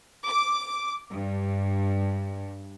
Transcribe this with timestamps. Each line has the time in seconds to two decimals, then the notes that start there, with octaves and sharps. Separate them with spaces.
0.25 D6
1.10 G2